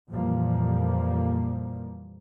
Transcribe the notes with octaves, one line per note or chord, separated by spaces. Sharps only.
F2 A#2 E3 F3 G3 A#3